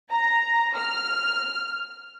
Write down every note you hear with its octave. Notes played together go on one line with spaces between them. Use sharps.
A#5
F6